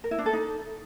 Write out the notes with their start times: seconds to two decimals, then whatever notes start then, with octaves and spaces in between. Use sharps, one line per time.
0.04 A#4
0.11 E4
0.18 D4
0.26 A4
0.33 D#4